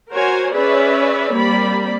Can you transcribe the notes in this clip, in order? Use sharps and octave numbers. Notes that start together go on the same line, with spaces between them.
F#4 A#4 C5 C#5 G#5
C#4 G#4 B4 C#5 D5 E5
G3 A#3 C4 D5 B5